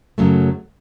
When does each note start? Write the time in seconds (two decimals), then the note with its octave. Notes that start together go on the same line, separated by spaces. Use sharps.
0.18 F#2 C#3 F#3 A3